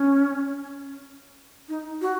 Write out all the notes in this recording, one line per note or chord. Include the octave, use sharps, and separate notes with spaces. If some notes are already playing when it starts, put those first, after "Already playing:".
Already playing: C#4
D#4
F#4